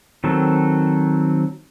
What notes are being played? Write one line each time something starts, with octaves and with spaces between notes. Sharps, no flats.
D#3 F#3 C4 A4